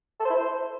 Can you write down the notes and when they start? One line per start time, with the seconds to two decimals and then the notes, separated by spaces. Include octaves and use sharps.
0.20 A4
0.25 C5
0.30 E4
0.35 C5